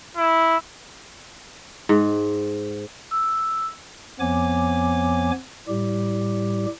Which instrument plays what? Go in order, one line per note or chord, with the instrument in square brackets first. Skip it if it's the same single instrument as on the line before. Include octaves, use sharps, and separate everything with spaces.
[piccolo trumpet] E4
[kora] G#2
[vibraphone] E6
[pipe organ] F2 F3 B3 C#5 G#5 D6
A2 G3 G4